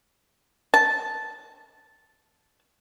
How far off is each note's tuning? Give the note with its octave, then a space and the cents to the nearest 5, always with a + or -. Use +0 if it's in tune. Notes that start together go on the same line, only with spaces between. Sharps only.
A5 -10